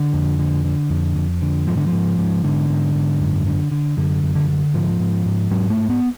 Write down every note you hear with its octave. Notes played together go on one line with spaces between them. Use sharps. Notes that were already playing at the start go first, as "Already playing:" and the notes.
Already playing: D3
F2
D3
D3
F2
F2
D3
G#2 F3
D3
F3
G#2
G#2
G#2 D3
G#2
G#2
F#2
D3
D3
F#2 D3
F#2
D3
D3
G#2 F3
G#2
G#2
G#2 F#3
A3
G#2
B3